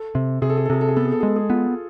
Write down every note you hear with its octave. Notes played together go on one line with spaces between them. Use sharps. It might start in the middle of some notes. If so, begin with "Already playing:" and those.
Already playing: A4
C3
C3 G#4
A4
G#4
A4
C3 G#4
A4
G#4
B3 A4
G#4
A4
G#3 G#4
A4
G#4
B3 F4